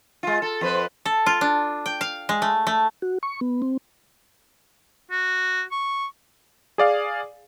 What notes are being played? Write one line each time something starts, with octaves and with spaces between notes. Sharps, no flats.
G#3 F4
A4
F2 B4 C5
A4
F4
D4
G5
F5
G#3
A3
A3
F#4
C#6
B3
C4
F#4
C#6
G#4 D5 F5